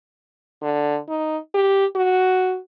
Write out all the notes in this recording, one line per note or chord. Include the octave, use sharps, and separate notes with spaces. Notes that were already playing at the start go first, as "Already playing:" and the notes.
D3
D#4
G4
F#4